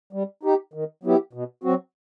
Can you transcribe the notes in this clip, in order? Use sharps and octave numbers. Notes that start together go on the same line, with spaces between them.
G3
D#4 G4
D#3
F#3 B3 E4 G4
B2
F#3 C4 F#4